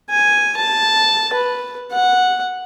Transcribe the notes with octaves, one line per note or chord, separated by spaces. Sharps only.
G#5
A5
B4
F#5